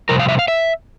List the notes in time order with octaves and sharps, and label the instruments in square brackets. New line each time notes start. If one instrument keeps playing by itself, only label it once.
[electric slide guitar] F2 C3 G3 A#4
F5
E5
F5
E5